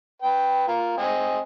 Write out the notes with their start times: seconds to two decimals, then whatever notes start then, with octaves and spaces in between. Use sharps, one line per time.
0.22 B4 G5
0.68 F4 A#4
0.98 C4 D#5 G#5